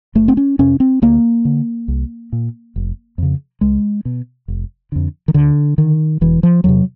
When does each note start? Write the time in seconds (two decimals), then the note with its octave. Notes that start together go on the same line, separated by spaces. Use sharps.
0.15 F#1 A3
0.28 C4
0.37 C#4
0.59 F2 C3 C#4
0.80 C4
1.02 D2 A#3
1.45 D3
1.88 C2
2.32 A#2
2.76 F1
3.18 F2 C#3
3.61 C#2 G#3
4.05 B2
4.48 F1
4.92 F2 D3
5.28 D#3
5.34 D2 D3
5.78 D3 D#3
6.21 E1 E3
6.43 F3
6.64 E2 C3 F#3